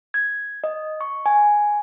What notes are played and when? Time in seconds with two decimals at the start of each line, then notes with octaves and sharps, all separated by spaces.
0.14 G#6
0.64 D#5
1.01 C#6
1.26 G#5